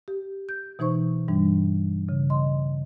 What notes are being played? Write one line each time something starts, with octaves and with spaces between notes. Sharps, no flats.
G4
G6
B2 E3 D#4 C5 C#6
G2 E3 G3 D4
C#3
D#5 C6